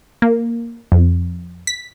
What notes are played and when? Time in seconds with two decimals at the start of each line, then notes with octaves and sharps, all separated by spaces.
0.22 A#3
0.92 F2
1.67 B6